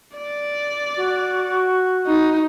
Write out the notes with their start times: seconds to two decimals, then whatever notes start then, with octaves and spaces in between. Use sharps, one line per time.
0.17 D5
0.97 F#4
2.07 D#4